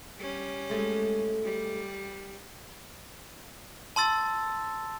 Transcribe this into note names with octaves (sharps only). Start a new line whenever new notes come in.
G3 C#4
G#3 A3
G3
A5 C6 E6 A6